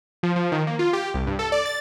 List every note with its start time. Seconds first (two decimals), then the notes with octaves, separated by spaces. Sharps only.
0.23 F3
0.36 F3
0.52 D#3
0.67 A#3
0.79 F4
0.93 G4
1.14 C2
1.27 G2
1.39 A4
1.52 D5
1.65 A6